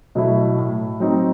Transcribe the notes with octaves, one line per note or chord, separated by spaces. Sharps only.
B2 F#3 A3 E4
A2
F#3 C4 D#4